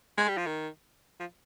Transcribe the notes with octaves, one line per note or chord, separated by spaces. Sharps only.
G#3
G3
F3
D#3
F3